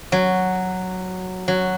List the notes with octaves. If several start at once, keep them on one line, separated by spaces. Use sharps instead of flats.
F#3
F#3